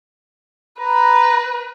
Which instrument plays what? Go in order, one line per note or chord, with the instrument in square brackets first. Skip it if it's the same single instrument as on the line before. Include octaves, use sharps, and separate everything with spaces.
[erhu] B4 [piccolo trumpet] A#5